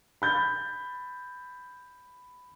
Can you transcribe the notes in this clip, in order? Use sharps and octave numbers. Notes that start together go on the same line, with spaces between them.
B5 G6 A6